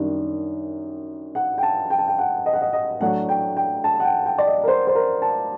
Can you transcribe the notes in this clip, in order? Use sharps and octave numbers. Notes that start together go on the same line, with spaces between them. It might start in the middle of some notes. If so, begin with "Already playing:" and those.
Already playing: F#2 D#3 G3 D4
F#5
G5
A5
G5
A5
G5
F#5
D#5
F#5
D#5
D#5
A2 F#3 A3 D4 F#5
G5
G5
A5
F#5
G5
G5
D5
D#5
A#4
C5
C5
A#4
A5